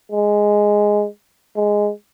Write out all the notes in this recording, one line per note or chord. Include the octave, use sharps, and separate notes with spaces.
G#3
G#3